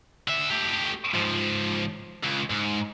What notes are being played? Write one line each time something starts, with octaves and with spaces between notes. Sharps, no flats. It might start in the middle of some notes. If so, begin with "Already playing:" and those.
D3 E5
A3 G4
G#2 F3
C#2
G#2